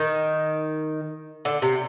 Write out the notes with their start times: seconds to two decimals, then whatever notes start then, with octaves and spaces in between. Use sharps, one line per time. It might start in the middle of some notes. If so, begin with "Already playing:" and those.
Already playing: D#3
1.45 D3
1.62 C3